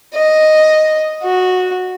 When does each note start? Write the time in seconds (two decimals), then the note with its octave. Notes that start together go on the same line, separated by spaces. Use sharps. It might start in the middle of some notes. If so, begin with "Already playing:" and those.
0.14 D#5
1.23 F#4